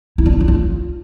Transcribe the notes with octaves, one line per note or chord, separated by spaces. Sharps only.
E4
D4
F4
D4
F4